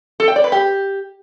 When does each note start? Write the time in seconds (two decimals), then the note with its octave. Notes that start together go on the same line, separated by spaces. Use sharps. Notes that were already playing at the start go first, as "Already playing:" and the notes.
0.20 A4
0.28 G5
0.36 D5
0.44 B4
0.52 G4